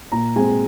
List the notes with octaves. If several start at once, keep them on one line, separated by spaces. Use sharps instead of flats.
A#2 A#5
G#3 C4 G#5